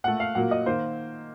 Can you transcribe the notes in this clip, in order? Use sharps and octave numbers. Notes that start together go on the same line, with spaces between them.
A#2 A3 F#5
F5
A#2 F#3 A#3 F#5
D#5
D#3 A#3 C5